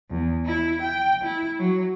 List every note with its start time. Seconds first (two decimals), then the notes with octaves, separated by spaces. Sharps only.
0.11 E2
0.46 E4
0.81 G5
1.24 E4
1.59 F#3